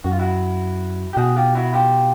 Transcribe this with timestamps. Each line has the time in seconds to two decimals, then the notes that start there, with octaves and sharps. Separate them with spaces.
0.04 F#2 F#4
0.12 F4
0.19 E4 F#4
1.13 G4
1.17 B2 F#4 G#4
1.36 F4 G4
1.55 E4 F#4
1.73 F4 G4